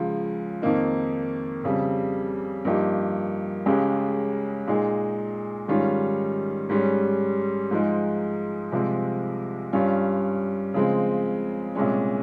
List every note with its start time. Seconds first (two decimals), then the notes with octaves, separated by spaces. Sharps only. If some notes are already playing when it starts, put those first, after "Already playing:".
Already playing: C#2 C#3 F3
0.62 F2 D#3 A#3 D#4
1.64 F2 C#3 G3
2.65 G2 F3 A#3 D#4 G4
3.66 C#2 C#3 G#3 C#4 G4
4.67 A#2 G#3 D#4 G#4
5.68 G#2 D#3 G3 C#4 F4
6.69 G#2 G3 C#4
7.71 G#2 F3 G#3 D#4
8.72 C2 C3 F3 G#3
9.73 G2 G3 C#4 F4
10.74 C#3 F3 G#3 C4
11.75 C2 A#2 G#3 C#4